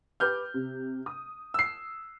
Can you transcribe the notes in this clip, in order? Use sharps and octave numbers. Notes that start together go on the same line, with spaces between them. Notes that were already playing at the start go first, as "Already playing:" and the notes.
G4 B4 D6 F6 G6
C3
D#6
E6 C7